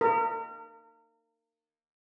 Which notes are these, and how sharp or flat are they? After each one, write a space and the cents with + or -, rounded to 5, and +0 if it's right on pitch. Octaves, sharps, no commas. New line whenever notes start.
A#4 -35